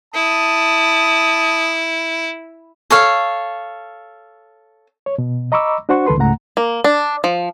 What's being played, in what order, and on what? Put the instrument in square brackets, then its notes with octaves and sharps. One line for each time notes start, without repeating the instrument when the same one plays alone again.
[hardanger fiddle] E4 [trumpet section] A5 D#6
[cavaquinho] A4 C#5 F5
[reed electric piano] C#5
B2
D#5 A#5 B5 C#6 D6 E6
D4 F#4 C5 F#5 C#6
C#2 D#3 A4 B4 C6
C#2 G#2 A3 F#5 A#5
[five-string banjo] A#3
D4
F3